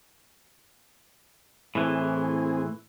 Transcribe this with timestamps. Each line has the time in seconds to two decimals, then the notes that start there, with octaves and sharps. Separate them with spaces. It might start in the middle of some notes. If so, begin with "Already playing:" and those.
1.75 A2 E3 C4 G#4